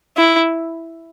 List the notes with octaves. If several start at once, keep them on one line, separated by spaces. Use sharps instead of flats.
E4